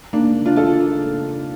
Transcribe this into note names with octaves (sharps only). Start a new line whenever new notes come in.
A#3 D4
D4 F4
F4 A4